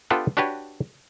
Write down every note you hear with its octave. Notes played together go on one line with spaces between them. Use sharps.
B3 D4 F4 G4 A4 B4
D4 F#4 G4 B4 C#5